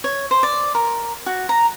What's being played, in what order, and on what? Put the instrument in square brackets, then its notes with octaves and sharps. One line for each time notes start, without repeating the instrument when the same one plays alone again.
[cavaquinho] C#5
C5
D5
A#4
F#4
A#5